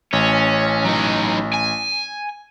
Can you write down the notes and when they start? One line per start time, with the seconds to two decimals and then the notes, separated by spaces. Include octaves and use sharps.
0.13 A1 C#4
0.85 F#3 D#4
1.54 G#5